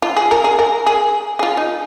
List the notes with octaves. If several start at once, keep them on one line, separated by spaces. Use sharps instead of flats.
F4
G#4
A#4
G#4
A#4
G#4
G#4
F4
D#4